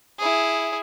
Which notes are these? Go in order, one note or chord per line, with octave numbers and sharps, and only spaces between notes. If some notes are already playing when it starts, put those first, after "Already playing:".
E4 G#4